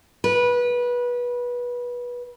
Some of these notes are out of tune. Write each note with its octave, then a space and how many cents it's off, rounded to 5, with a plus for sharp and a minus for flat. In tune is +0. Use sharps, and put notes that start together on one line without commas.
B4 -20